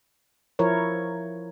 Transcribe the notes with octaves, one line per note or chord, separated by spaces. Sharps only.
F3 E4 A#4 C#5